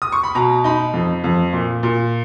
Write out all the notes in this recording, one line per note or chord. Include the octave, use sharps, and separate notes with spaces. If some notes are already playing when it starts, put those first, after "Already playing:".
D#6
C#6
B5
B2 A#5
D#4 B5
F2
F2
A#2
A#2